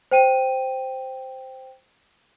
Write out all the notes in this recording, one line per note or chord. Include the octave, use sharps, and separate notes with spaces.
C5 G5 D#7